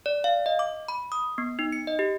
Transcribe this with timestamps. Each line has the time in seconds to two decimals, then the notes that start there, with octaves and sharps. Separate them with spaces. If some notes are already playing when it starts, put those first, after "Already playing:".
0.06 D5
0.24 F5
0.46 D#5
0.59 D6
0.88 B5
1.12 D#6
1.38 B3
1.59 D#4
1.72 C#7
1.87 D#5
1.99 G4